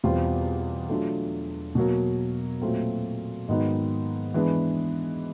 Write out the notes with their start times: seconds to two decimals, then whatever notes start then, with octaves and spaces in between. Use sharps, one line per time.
0.04 E2 B2 G3 C4 F4
0.90 F#3 A3 D4 F4
1.75 B2 F#3 A#3
2.62 A#2 F#3 A3 C4 F4
3.48 G#2 D#3 F#3 B3 D#4
4.34 E3 G#3 B3 D4